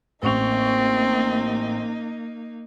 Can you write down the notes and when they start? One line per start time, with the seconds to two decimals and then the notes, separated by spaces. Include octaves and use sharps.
0.23 A1 A#3 C4 D#4 C#6 F7